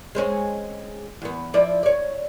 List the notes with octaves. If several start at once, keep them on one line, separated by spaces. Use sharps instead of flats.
G#3 C4 C#4
E2 B3
F3 E4 D5
C#5 D5